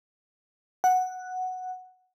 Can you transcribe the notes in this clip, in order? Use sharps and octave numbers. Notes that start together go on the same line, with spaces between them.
F#5